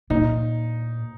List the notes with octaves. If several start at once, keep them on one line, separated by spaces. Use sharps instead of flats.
A#2 D#4